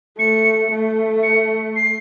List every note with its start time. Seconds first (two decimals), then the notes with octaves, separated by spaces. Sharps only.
0.18 A3 C#7
0.71 A3
1.23 C#7
1.75 C7